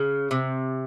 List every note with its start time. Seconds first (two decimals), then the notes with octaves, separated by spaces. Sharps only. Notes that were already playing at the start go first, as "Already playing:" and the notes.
Already playing: C#3
0.31 C3